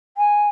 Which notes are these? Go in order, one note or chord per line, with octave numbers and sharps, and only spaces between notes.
G#5